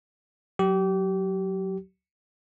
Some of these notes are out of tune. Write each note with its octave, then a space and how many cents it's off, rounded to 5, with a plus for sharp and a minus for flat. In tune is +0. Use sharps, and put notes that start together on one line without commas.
F#3 +0 G4 -30